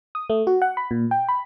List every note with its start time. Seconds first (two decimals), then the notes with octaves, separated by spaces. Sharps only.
0.15 D#6
0.30 A3
0.47 F#4
0.62 F#5
0.77 B5
0.91 A#2
1.11 G5
1.29 B5